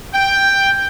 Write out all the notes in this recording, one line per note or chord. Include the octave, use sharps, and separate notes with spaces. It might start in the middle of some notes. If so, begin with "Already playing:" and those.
G5